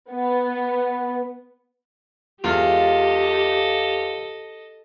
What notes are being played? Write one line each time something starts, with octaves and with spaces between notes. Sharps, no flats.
B3
E2 G#3 F4 G4 A4 D#5 F6